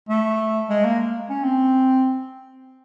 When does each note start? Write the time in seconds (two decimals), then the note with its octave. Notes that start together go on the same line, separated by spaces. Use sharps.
0.09 A3
0.69 G#3
0.85 A#3
1.29 C#4
1.43 C4